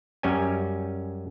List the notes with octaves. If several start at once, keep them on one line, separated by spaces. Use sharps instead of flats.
F#2 G3 C#4 G#5